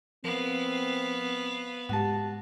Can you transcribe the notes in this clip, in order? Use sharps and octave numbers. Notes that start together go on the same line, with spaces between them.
F3 B3 C4 A#4 F5
G#2 G#3 F#4 G4 A5